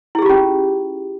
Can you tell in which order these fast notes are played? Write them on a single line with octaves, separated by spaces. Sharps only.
E4 G#4 G4 F4 C#4